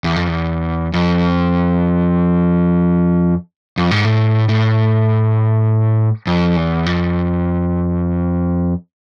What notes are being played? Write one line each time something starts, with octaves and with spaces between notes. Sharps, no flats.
E2
F2
E2
F2
F2
G#2
A2
A2
F2
E2
F2